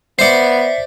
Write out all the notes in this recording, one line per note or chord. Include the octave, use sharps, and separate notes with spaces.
B3 C5 D5 E5 C7 C#7